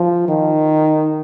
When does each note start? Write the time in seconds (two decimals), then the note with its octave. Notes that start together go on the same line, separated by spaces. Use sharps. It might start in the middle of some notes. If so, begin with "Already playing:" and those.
Already playing: F3
0.28 D#3